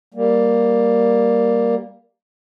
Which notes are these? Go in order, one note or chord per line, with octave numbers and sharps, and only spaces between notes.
G3 A#3